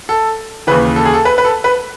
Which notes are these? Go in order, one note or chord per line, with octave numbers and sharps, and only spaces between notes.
A4
D#2 C#3 E3 B4
A4
G#4
A4
B4
B4
A4
B4